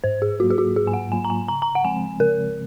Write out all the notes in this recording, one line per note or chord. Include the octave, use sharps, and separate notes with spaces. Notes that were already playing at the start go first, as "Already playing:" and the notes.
G#2 C5
G#4
F#3 A#3 F4 F#4
G#4
F#4
G#2 G#4
G#5
F#5
F#3 A#3 F4 G#5
A#5
G#5
C#3 A#5
A#5
F#5
F3 G#3 C4 G#5
C#3 A#4